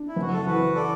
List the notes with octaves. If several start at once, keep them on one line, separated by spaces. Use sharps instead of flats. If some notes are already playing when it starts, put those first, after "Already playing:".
Already playing: D4
E4
F#1
F#4
A4
E3 F#4 B4
A4 D5